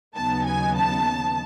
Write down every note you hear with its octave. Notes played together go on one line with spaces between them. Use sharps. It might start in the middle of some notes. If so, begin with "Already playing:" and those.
D#2 C#3 F#3 B3 D#4 A5
G#5
A5